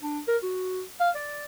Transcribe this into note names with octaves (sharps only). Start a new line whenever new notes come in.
D4
A#4
F#4
F5
D5